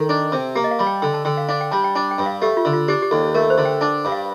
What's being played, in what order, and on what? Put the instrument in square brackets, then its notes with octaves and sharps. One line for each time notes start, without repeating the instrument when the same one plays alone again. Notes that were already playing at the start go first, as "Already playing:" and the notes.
Already playing: [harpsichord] D#3 [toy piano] A4
[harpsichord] D4
C3
[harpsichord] A#3 [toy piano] G4
[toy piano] D#5
F5
[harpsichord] G3
[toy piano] G5
[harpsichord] D3 [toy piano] G5
[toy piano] A5
[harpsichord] D3 [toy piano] G5
[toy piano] F5
[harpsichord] D4 [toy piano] F5
[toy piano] G5
[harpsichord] G3 [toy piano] A5
[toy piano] G5
[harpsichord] D4 [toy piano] A5
[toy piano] G5
[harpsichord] G2
[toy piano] F5
[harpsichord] A3 [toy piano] G4
[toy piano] F4
[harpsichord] D3
[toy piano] F4
[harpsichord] D4 [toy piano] G4
[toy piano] G4
[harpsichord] D#2 [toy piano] A4
[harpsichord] A3 [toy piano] A#4
[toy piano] C5
[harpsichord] D3
[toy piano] G5
[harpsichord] D4 [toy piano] A5
[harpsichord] G2
[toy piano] F5